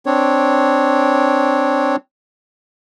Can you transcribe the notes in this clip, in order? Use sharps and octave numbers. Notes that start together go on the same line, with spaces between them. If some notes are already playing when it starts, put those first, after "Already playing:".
C4 D4 C#5